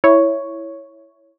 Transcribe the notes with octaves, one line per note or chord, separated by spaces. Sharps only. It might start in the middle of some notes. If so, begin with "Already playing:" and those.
E4 C#5